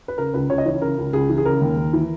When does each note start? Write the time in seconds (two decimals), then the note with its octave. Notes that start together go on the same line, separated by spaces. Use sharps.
0.08 B4
0.18 C#3 A#4
0.34 C#2 B4
0.50 C#2 C#5
0.58 D#5
0.66 E3 C#5
0.82 C#3 A#4
0.98 C#2
1.13 C#2 G#4
1.29 E3
1.38 G#4
1.45 C#3 A#4
1.61 D#2
1.77 D#2
1.93 E3